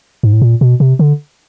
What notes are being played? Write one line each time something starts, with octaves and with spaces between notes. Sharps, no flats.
G#2
A2
A#2
B2
C3
D3